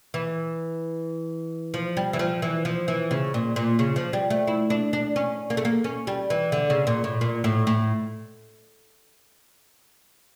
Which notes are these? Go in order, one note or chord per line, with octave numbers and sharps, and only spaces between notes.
E3
F3
G3
E3
F3
E3
F3
E3
C#3
A#2
A#2
C#3
F3
G3
A3
E4
D4
D4
C#4
A#3
A3
A#3
C#4
G3
E3
D3
C#3
A#2
A2
A#2
A2
A2